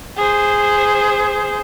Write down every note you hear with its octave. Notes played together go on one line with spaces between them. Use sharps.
G#4 C5